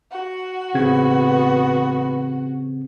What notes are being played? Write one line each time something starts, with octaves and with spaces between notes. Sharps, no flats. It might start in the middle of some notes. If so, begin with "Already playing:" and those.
F#4
A1 C#3 B3 C4 G#6